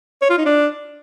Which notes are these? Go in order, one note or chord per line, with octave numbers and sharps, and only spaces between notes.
C#5
F4
D#4
D4